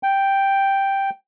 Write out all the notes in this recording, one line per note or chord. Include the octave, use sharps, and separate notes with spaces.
G5